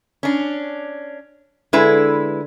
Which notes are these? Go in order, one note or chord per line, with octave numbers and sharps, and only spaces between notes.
C#4 D4
D3 G#3 E4 B4